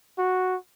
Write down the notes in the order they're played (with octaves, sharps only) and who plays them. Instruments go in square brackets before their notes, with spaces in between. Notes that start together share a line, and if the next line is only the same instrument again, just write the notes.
[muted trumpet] F#4